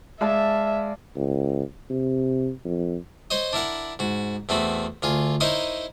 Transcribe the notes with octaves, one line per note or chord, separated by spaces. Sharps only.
G#3 D5 E5 F5 A5
C#2
C3
F2
C5 C#5 D#5
D4 E4 A#4 F#5
G#2 F#4
E2 A3 C4 F#4 B5
D2 F4 G#4
D#4 E4 A#4 C5 C#5 D#5